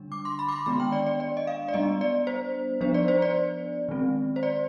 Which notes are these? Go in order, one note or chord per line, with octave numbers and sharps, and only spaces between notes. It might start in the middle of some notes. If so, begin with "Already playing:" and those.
Already playing: D3 G3 D4
D6
C6
B5
D6
C6
D#3 G#3 B3 D4 B5
G5
D5
D5
D5
D#5
F5
D5
G3 B3 D4 D#5
D5
C5
F3 B3 D4 C5
D5
C5
D5
D#3 G#3 C4
C5
D5